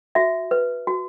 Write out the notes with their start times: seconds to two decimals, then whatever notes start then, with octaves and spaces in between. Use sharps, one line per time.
0.15 F#4 E5
0.51 B4
0.87 F#4